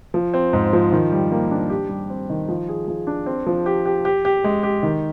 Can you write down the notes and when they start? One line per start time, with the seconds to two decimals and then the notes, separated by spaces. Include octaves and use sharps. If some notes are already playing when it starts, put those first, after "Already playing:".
0.14 F3
0.34 C4
0.53 G#2
0.73 F3
0.92 D#3
1.12 G3
1.32 A#3
1.51 D4
1.70 G4
1.89 G3
2.10 C4
2.30 D#3
2.49 F3
2.69 G#4
2.88 F3
3.07 D4
3.26 C4
3.47 F3
3.66 G4
3.86 G4
4.05 G4
4.25 G4
4.44 G#3
4.63 G4
4.83 D#3